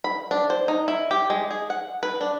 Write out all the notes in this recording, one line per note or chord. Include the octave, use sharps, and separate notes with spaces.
B5
D4
C5
D#4
E4
G4
G#3
G#4
F#5
B4
D4